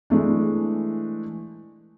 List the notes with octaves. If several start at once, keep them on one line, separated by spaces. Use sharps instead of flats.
E3 G#3 A3 D4